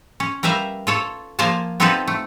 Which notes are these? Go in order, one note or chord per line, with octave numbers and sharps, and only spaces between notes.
C#4
G3 A#4 B4 E5 F5
F4 A4 C#5
F3 A#3 F4 F5 G#5 A5
B3 C4 D#4 F4 A4 B4
A3